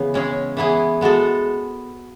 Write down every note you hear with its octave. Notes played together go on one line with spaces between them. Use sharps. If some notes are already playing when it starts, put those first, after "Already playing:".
Already playing: C#3 E3 B3
G#3 C#4 G#4
E3 B3 E4 G#4
G#3 B3 F#4 A4